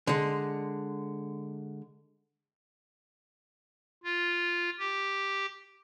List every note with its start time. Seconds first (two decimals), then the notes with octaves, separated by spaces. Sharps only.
0.07 D3 G#3
4.04 F4
4.79 G4